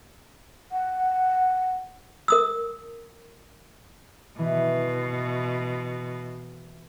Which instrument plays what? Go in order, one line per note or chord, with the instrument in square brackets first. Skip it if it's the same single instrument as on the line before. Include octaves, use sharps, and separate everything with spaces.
[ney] F#5
[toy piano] A#4 D#6 E6
[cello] B2 [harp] E3